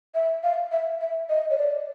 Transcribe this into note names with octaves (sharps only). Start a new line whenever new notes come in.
E5
F5
E5
E5
D#5
C#5
D5